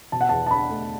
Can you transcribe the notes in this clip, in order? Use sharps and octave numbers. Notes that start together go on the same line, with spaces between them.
B2 A5
F#5
E2 A5
A5
D4 B5
A3